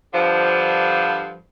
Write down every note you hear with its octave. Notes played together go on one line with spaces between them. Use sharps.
G2 D3 F3